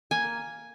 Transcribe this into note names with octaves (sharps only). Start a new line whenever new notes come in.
A#3 G#5